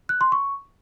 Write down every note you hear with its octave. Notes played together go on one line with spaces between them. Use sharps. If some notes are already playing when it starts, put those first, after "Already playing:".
F#6
C6
C#6